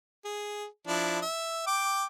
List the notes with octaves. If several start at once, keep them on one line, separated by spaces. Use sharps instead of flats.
G#4
F3 D4 E4
E5
G5 D6